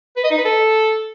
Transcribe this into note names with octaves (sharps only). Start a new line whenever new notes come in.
B4
D#5
D#4
B4
A4